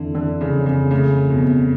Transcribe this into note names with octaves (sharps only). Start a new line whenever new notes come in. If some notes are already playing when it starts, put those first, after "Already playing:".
Already playing: F2 D3 E3
D3 E3
C#3
F2
C#3
C#3 A3
F2 B2